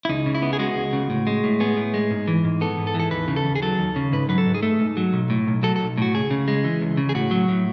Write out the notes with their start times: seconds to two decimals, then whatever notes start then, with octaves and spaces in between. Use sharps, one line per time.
0.05 E4
0.09 C#2 D#4
0.26 C#3
0.35 E4
0.42 B3
0.53 G#4
0.59 G#3 F#4
0.76 C#2
0.93 C#3
1.10 A2
1.27 G#3
1.44 A2
1.60 B3 G#4
1.77 A2
1.94 G#3
2.11 G#2
2.28 E3
2.44 G#2
2.61 B3 A4
2.78 G#2
2.87 A4
2.95 E3
3.00 A4
3.11 D#2 B4
3.28 C#3
3.36 A4
3.45 D#2
3.55 G#4
3.62 F#3 A4
3.79 D#2
3.96 C#3
4.12 G#2 B4
4.29 F#3 B4
4.38 A4
4.46 G#2
4.54 G#4
4.62 A3 A4
4.80 G#2
4.97 F#3
5.13 B1
5.30 A2
5.47 B1
5.63 F#3 A4
5.76 B1 A4
5.98 A2 F#4
6.14 C#2 G#4
6.31 C#3
6.48 G#3
6.64 E3
6.81 C#2
6.97 C#3
7.09 G#4
7.15 A2 F#4
7.31 F#3
7.48 A2